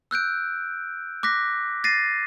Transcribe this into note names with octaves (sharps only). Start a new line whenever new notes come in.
E6 F#6 G6 D7
D6 F#6 A#6 B6
A6 A#6 C7 D#7